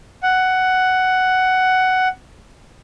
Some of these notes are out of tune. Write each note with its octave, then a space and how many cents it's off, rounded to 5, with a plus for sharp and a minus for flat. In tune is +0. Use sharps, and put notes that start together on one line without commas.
F#5 +10